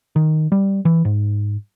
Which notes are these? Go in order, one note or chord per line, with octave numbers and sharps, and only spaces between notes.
D#3
G3
E3
G#2